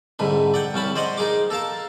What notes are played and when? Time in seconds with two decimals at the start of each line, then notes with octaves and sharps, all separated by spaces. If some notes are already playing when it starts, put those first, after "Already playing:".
0.19 C2 G#2 D3 B4
0.54 D5 F#5 G5
0.74 C2 C#4 A5 B5
0.96 C5 D5 D#5 F#5 C6
1.18 D#4 G#4 A#4 D6
1.50 A4 A#4 F5 A5